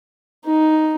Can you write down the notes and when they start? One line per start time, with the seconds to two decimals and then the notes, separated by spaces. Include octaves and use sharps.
0.46 D#4